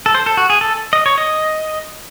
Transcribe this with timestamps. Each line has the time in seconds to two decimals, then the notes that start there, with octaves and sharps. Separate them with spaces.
0.06 A4
0.15 C5
0.26 A4
0.37 F#4
0.50 G#4
0.61 A4
0.93 D#5
1.06 C#5
1.18 D#5